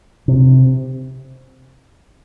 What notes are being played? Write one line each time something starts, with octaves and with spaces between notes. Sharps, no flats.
C3